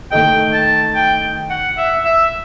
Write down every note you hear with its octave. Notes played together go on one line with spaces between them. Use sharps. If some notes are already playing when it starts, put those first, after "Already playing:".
D#3 A3 D#4 A4 D#5 G5
A5
G5
F#5
E5
E5